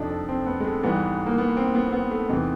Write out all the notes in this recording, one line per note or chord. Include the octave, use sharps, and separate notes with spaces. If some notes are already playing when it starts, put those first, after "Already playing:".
Already playing: F2 C3 F3 D4 D#4 A4
D4
C4
B3
G#3
A3
G#2 E3 G3 B3
A#3
B3
C4
B3
C4
B3
A3
E2 C3 E3 D#4